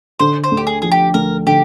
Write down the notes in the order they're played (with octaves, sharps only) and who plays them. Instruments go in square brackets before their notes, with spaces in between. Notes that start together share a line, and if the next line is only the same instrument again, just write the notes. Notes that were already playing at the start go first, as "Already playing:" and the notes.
[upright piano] D3 [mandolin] C5
[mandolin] C5
[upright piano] D2
[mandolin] G4
G#4
[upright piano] F3 [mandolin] G#4
[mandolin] G4
[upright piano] D2 [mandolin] A#4
[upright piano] D3 [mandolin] G4